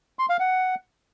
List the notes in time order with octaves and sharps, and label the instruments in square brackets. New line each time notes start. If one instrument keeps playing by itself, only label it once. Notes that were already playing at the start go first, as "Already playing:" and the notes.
[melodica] C6
F5
F#5